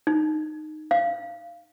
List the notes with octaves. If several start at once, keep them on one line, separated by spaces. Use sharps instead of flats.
D#4
F5